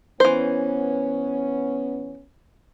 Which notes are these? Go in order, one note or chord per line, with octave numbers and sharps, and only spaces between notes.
E3 B3 C#4 C5